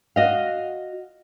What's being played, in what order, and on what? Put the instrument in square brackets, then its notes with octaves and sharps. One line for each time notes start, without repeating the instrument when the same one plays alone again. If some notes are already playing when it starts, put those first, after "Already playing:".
[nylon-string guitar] F#4 D#5 F5